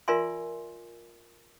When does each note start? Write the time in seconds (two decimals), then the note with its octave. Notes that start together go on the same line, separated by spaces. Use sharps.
0.08 F4 A#4 D5 E5 G#5 C6